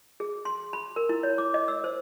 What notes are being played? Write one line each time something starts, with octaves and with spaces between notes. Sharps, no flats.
G#4
C6
B5
A#4
E4
C#5
D6
D#5
E6
C5